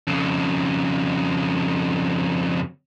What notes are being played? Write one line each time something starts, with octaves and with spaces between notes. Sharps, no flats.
F2 C#3